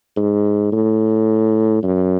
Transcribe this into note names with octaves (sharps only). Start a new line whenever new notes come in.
G#2
A2
F#2